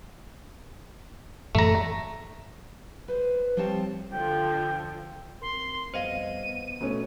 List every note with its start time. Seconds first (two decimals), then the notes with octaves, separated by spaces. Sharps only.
1.55 F#2 A2 E3 A3 A#5
3.08 B4 C5
3.57 F3 G3 C4 C#5 A5
4.12 D3 F3 G5
5.42 C4 A#4 C6
5.94 F2 G3 B3 C5 D#5 F5 D#7
6.46 B3
6.81 B2 A3 C#4